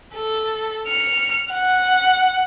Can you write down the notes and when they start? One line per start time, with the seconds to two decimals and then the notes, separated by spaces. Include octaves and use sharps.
0.15 A4
0.87 F6 C#7
1.51 F#5